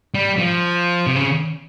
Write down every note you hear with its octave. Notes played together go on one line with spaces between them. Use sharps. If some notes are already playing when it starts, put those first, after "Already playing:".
G3
F3
C3
C#3